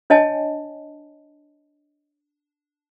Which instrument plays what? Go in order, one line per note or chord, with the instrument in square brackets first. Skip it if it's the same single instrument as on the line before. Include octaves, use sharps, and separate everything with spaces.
[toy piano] D4 C#5 D#5 G#5 A5